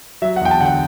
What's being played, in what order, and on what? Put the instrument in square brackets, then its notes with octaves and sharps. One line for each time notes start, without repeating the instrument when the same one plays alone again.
[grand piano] F#3 E5
F#5
E2 G5
A5
D3 F#5
G5